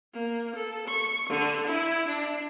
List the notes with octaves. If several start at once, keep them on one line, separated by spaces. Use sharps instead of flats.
A#3
A4
C#6
D3
E4
D4